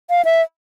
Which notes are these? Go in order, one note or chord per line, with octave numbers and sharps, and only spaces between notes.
F5
E5